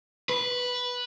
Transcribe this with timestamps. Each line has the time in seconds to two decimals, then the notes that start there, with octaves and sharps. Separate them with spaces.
0.29 B4